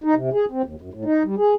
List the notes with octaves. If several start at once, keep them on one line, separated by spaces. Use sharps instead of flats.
D#4
C3
G#4
C4
D#2
F#2
A2
D#4
G3
G#4